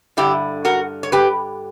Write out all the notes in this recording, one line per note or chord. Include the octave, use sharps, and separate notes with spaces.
G2 D3 E4 G4
F#4 A#4
C#5
G4 B4